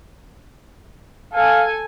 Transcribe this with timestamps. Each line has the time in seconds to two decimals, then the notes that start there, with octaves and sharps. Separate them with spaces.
1.33 A4 F5 G#5